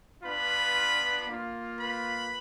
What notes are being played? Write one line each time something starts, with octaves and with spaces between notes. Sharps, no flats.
B3 D4 F4 B4 B5
A#3 F4
B4 B5